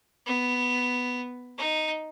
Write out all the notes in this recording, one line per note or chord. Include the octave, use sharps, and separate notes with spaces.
B3
D#4